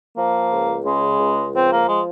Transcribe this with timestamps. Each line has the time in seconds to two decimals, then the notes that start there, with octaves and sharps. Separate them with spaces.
0.16 F3 A#3
0.50 C#2
0.84 C#3 G#3
1.19 C#2
1.54 F3 C4
1.71 A#3
1.88 G#3